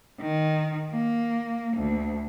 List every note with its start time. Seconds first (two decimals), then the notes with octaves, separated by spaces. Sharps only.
0.21 D#3
0.91 A#3
1.77 D2